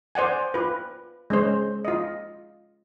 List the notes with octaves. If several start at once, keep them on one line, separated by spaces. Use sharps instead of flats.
C5 D5 F#5 G#5
F4 B4
G#3 C#4 C5
F4 D#5